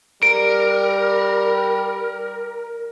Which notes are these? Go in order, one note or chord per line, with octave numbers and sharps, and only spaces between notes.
G3 A#4 D7